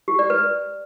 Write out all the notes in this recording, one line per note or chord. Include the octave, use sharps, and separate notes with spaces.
G4
D5
B4